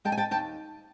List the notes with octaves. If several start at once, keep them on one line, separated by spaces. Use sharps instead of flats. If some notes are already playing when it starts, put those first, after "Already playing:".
G#3 G5 A5
G#5
G5 A5
D#2 G5 A5